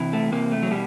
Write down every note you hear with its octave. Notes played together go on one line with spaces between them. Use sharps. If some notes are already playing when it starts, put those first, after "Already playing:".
Already playing: C3 E3
A3
C3 A#3
A3
F#3
B2 G3